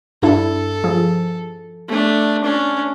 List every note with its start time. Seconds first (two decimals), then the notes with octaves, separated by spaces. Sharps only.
0.23 G2 D4 E4 A4
0.84 F3 G#4
1.88 A3 D4
2.44 C#4 D4